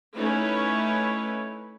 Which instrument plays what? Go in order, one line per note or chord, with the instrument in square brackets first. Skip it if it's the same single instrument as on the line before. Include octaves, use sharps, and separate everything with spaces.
[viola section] A3 C#4 D#4 E4 B4 C#5